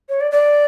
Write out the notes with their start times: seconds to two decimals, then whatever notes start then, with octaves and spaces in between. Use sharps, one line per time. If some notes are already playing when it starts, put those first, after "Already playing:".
0.09 C#5
0.21 D5
0.32 D5